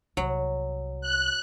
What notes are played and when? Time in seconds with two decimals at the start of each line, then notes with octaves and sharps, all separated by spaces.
0.17 C2 F#3
1.01 F#6